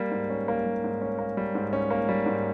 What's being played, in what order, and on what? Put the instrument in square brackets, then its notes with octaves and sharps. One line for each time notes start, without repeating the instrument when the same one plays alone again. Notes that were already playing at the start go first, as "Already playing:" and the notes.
Already playing: [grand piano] G3 A#3
G#2
C#4
A#3
G3
G#2
C#4
A#3
G3
G#2
C#4
A#3
G3
G#2